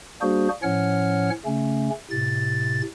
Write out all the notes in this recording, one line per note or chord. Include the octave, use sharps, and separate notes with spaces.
G3 A#3 D4 F#4 G#4 C5
A2 F3 C#4 C#5 F#5 F6
C#3 A3 C#4
A2 C3 A6